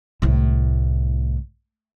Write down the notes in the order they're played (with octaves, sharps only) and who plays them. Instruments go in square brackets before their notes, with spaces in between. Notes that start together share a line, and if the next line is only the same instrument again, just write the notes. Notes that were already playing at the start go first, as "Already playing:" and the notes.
[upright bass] C2 A2